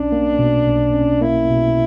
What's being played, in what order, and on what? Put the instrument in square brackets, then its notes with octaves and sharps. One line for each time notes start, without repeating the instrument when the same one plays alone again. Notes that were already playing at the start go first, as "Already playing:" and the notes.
Already playing: [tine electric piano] B1 C#4 [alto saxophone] D4
[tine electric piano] A#3
B2
B1
C#4
[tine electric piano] A#3 [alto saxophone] E4
[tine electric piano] B2